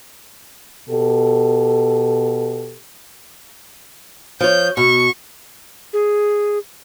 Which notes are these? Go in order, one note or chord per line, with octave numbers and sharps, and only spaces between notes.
B2 G4 A4
F3 C#5 G6
B2 C#6
G#4